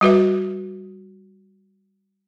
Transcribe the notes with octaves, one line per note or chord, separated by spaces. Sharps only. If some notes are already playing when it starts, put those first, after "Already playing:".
G3 F#4 B4 E5